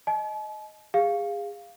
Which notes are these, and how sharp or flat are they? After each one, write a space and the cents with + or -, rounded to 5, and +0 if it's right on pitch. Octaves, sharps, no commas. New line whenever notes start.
D#5 +0 A5 -45
G#4 -30 F5 +0